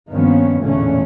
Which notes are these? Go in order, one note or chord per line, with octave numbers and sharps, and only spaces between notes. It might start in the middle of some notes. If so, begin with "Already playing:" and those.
G2 D#3 F3 A#3 B3 C#4
A1 E2 A#2 D3 A3 C#4